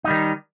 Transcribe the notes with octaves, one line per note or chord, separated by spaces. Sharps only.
D#3 G3 D#4